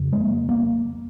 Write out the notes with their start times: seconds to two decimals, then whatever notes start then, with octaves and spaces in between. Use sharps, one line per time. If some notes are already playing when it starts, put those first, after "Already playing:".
Already playing: F2 C#3
0.12 G#3
0.21 A#3
0.49 A#3